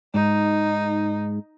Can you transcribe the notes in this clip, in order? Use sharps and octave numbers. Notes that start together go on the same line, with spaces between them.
G#2 D#4